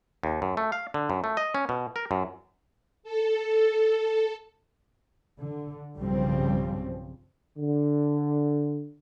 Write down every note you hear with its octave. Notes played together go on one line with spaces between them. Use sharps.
D#2
F#2
A3
F5
D3
F#2
A3
D#5
C#4
B2
A#4
F#2
A4
D3
B1 G2 C#3 F3 G3 C4
D3